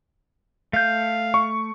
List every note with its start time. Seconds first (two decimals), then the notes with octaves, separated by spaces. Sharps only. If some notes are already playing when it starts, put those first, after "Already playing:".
0.73 A3 F5 G6
1.34 C#6